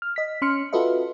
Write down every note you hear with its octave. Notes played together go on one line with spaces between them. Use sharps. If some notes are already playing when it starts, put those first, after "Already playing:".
F6
D#5 B6
C#4 C6 F6 C#7
F4 F#4 A4 B4 D#5 E5